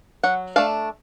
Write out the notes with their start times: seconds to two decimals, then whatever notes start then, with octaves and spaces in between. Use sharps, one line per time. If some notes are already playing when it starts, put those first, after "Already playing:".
0.23 F#3 F#5
0.56 A3 D4 F5